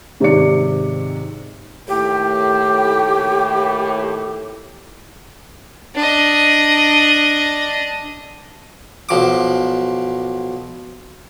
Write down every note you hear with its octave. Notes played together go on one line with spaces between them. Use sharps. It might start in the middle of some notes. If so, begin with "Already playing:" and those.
G#2 C3 D#3 C#5 D5 C#7
D#2 A2 G4
D4 D#5
B1 F3 D6